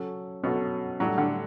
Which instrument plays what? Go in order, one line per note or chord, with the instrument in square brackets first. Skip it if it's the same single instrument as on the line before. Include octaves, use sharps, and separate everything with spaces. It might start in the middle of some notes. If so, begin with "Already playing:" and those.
Already playing: [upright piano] F#3 C#4 F#4 A4
[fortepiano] B2 [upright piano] F#3 C#4 F#4 A4
[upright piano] A2 G3 D4 A4 [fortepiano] F#3
[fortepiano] D3